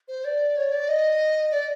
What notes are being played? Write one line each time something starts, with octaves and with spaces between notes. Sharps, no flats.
C5
D5
C#5
D5
D#5
D5